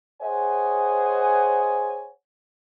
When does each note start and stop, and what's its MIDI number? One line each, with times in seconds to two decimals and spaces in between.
0.22 2.08 68
0.22 2.08 72
0.22 2.08 73
0.22 2.08 75
0.22 2.08 78
0.22 2.08 80